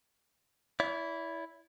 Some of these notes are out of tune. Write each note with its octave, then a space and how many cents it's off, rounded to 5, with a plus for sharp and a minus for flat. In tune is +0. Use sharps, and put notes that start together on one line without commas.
E4 +0 D5 -45